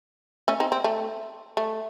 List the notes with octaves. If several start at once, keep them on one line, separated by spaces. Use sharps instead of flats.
A3 C#4
C4 D#4
C4
A3
A3